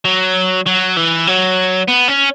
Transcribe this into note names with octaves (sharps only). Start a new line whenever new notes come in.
F#3
F#3
E3
F#3
B3
C#4